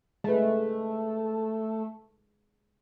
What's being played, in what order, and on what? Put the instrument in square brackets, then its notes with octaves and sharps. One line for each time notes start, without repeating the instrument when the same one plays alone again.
[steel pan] G#3 B4 [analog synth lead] A3